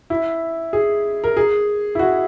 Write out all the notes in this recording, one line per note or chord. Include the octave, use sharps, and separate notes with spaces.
E4
G#4
A#4
G#4
E4
F#4